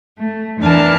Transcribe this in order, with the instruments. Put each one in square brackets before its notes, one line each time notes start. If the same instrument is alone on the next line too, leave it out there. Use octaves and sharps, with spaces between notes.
[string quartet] A3
E2 E3 D4 A#4 A5 F6